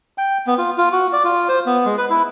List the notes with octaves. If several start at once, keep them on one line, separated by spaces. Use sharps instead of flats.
G5
B3
F4
F4
F#4
D5
F4
C5
B3
G#3
B4
E4